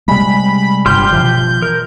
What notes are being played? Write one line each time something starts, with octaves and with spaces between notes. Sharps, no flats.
C3 G3 G#3 B5
G1 G2 G4 C6 F6 G6
B2 E3 F3
A#4